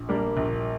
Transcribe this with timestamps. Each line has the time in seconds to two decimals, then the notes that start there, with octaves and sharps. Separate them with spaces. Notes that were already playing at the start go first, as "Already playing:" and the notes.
Already playing: A#1
0.09 G3 A#3 D4
0.37 A#1